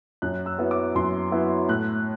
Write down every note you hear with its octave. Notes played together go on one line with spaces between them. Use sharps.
F#2 F#6
E6
F#3 B3 E4
D6
F#2 C6
F#3 B3 E4
A2 F#6